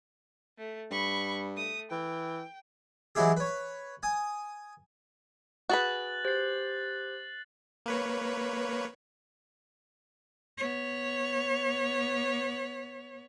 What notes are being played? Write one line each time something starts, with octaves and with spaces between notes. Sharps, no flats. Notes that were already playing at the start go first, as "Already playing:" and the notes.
A3
G2 B5 C#6
A3 D#6
E3 G5
E3 F#3 G#3 E4 G4 G#4
B4 C#5
G#5 D#6
F#4 G#4 B4 F#6 A6 F#7
G4 C5 A6 C7
A#3 B4 C#5
B3 C#5